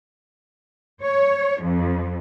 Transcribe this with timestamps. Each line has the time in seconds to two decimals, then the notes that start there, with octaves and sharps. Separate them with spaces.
1.03 C#5
1.63 F2